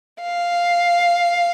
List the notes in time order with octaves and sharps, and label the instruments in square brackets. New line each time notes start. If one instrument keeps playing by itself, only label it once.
[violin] F5